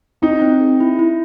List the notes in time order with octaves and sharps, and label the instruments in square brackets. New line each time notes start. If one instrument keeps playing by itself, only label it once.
[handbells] C4 [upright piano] D#4
[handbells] C4
G#4
E4
E4